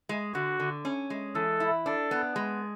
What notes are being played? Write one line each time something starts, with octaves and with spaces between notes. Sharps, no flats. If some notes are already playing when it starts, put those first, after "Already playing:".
G#3
D3 F#4
D3
C#4
G#3
E3 A4
E4
D4 A4
B3
G#3